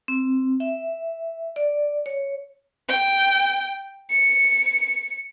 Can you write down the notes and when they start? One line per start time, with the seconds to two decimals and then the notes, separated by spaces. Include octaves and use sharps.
0.08 C4
0.60 E5
1.56 D5
2.06 C#5
2.89 G5
4.11 C#7